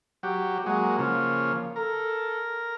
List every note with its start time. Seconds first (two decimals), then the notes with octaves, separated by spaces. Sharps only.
0.23 F#3 G4
0.66 F#3 G#3 A#3
0.99 C#3 F3
1.76 A4 A#4